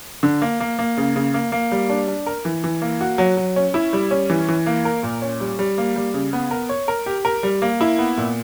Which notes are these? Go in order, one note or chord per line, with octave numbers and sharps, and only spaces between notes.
D3
A#3
A#3
A#3
C#3
C#3
A#3
A#3
G3
D4
D4
A#4
E3
E3
A#3
F#4
F#3
F#3
C#4
E4
G3
C#4
E3
E3
A#3
A#4
A#2
C#4
G3
G3
A#3
G3
C#3
B3
A#4
C#5
A#4
G4
A#4
G3
A#3
E4
B3
A#2